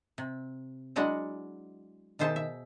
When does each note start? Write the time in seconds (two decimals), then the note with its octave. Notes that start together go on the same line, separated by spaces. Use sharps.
0.18 C3
0.96 F#3 G#3 D4 E4 F#4 F#5
2.19 B2 D#3 G#4 C5 E5 A5
2.36 E5